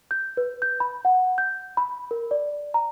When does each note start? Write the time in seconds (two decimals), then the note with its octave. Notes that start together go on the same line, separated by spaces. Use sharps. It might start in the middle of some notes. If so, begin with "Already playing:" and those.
0.11 G6
0.37 B4
0.62 G6
0.80 B5
1.05 F#5
1.38 G6
1.77 B5
2.11 A#4
2.31 D5
2.74 A#5